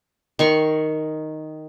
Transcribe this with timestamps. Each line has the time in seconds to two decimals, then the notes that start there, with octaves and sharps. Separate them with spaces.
0.39 D#3 C6 C#6